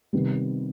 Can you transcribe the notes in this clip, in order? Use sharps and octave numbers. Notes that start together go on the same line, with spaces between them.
C3 D#3 G3 B3